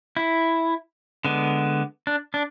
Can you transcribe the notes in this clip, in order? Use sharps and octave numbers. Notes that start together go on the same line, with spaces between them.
E4
D3 G#3 B3
D4
D4